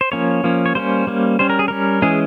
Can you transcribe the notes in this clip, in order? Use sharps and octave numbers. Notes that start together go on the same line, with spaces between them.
C5
F3 A#3 C#4 C#5
F3 A#3 C#4
C#5
G3 A#3 C#4 C5
G3 A#3 C#4
G3 C#4 C5
A#4
G#4
G3 C#4 A#4
E3 G#3 C#4 G#4